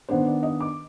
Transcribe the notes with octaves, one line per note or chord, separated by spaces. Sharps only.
D#3 B3 D4 C5
D5
D#5
D6